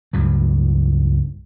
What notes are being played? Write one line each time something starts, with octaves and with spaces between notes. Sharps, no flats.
C#2 G2 F#3